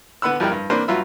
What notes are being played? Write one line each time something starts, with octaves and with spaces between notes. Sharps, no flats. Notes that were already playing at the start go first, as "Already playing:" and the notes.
D3 B3 F#5 B5 E6
F2 G3 E4 A#4 G5
G2
A#3 C4 D4 B4 C5
G2 F#3 F4 E5 B5